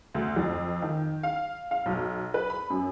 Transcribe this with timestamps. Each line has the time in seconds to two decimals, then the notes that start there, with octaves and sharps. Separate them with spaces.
0.15 D2
0.36 F2
0.82 D#3
1.23 F5
1.71 F5
1.86 B1
2.34 B4
2.50 B5
2.70 F#2